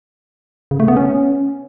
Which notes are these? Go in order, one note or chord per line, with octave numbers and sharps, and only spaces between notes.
C#3
A3
B3
C#4